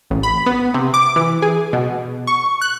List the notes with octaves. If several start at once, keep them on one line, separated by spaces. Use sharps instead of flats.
A1
B5
B3
C3
D6
E3
G#4
B2
C#6
F#6